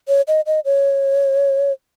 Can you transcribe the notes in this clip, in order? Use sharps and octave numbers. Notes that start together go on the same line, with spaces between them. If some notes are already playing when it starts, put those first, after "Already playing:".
C#5
D#5
D#5
C#5